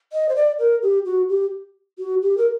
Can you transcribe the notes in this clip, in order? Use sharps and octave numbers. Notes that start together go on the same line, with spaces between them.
D#5
C5
D5
A#4
G4
F#4
G4
F#4
G4
A#4